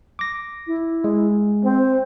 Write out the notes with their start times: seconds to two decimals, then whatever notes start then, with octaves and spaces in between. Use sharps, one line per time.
0.19 D6 A#6
0.67 E4
1.04 G#3
1.64 C4 C5